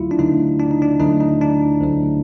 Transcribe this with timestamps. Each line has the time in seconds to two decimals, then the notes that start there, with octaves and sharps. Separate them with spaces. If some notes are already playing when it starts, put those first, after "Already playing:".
Already playing: D2 D3 F#3 A3 E4 F4
0.11 D4
0.19 D2 D3 F#3 A3 D#4
0.59 D4
0.71 D#4
0.82 D4
1.00 D2 D3 F#3 A3 D#4
1.21 D#4
1.41 D4
1.81 D2 D3 F#3 A3